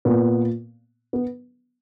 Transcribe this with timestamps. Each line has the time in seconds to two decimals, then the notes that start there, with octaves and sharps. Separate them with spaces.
0.05 A#2 B3
1.13 B3